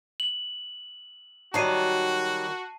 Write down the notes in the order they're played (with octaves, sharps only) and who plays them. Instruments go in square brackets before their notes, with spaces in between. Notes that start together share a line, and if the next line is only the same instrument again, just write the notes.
[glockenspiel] F#7
[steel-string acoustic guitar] D#3 F#3 G3 [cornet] F#4 [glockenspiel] A5 C7 D#7